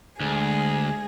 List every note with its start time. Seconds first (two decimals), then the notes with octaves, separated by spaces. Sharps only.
0.20 D2 G#3 G#4